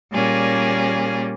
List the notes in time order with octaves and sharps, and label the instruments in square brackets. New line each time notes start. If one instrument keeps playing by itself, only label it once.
[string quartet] A#2 G3 A#3 C#4 G#4